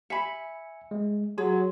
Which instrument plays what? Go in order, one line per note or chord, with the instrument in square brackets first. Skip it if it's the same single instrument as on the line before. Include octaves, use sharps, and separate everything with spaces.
[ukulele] E5 B5 [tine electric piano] G#5 C#7
[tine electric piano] G#3
[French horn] F#3 [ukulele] G#4 [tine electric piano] C6